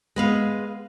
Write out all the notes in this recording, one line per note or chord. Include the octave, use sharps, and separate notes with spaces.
G#3 B3 F5